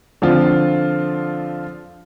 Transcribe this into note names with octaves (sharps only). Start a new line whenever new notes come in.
D3 F3 C4 F4